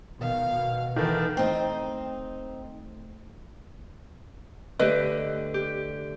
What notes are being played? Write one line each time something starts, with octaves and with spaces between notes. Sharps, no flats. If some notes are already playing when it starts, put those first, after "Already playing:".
B2 D#3 F5
B2
D#3 E3 B3 A4
A3 C4 D#4
D3 A3 G4 B4 D#5
G4